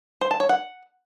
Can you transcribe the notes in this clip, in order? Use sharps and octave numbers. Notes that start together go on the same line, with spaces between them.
C5
A5
C#5
F#5